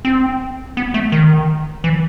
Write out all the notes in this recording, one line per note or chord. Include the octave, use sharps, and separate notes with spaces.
C4
B3
A3
D#3
E3